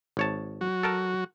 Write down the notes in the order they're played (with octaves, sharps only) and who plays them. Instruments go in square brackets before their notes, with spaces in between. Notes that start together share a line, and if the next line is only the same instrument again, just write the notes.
[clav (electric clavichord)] G#1 C#5 A5
[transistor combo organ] F#3 F#4
[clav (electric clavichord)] A4 A#4 A5